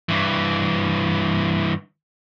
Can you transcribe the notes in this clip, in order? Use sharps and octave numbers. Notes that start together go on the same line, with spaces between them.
G2 E3